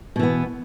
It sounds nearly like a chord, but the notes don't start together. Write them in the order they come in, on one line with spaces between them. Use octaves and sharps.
B2 E3 B3